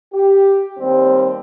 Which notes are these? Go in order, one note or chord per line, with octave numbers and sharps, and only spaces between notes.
G4
D#2 G3 C4